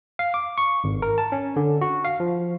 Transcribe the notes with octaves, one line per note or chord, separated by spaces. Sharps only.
F5
D6
C#6
G#1
A#4
A5
C#4
D3
F#4
F5
F3